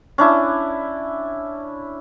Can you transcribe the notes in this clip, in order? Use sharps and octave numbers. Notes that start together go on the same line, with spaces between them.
C#4 D4 E4